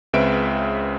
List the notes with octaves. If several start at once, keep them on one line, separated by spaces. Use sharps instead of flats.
C#2 C#3 C4 B4 E5 D7